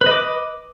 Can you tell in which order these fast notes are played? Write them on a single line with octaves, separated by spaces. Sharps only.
B4 D#5 D6